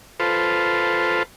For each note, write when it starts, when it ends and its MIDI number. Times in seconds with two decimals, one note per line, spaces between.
0.20 1.23 65
0.20 1.23 69
0.20 1.23 71
0.20 1.23 72